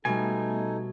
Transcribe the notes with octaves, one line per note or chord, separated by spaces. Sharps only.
B2 G3 A3 B3 D#4 A4 E5 G#5